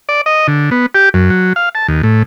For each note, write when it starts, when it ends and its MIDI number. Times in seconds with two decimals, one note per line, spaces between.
0.09 0.21 74
0.26 0.47 75
0.48 0.70 50
0.71 0.86 59
0.95 1.09 67
1.14 1.30 42
1.30 1.53 54
1.56 1.69 77
1.75 1.87 81
1.88 2.02 39
2.03 2.23 45